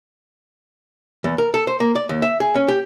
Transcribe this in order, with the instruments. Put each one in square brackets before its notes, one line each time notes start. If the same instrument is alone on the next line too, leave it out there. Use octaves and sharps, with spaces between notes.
[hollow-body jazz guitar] E2
A#4
A4
C5
A#3
D5
D#2
E5
G#4
C#4
G4